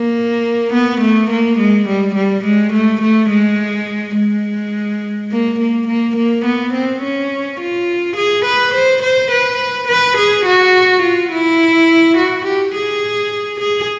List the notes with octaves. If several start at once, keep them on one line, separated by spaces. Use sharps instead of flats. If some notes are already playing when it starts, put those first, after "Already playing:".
Already playing: A#3
B3
A3
A#3
G#3
G3
G3
G#3
A3
A3
G#3
G#3
A#3
A#3
A#3
A#3
B3
C4
C#4
F4
G#4
B4
C5
C5
B4
B4
G#4
F#4
F4
E4
F#4
G4
G#4
G#4